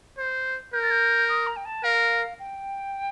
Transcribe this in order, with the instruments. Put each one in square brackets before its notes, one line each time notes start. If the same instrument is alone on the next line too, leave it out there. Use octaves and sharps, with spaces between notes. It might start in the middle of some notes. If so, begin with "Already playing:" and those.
[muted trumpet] C5
[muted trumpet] A#4 [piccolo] G6
[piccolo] A6
G6
D#6
A#5
G5
A5
[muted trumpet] A#4 [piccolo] F5
[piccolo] G5